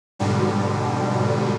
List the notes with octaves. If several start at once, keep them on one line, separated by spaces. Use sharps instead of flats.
F2 G#2 B2 D3 G3